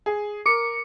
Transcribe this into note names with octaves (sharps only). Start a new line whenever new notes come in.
G#4
A#4 D6 C#7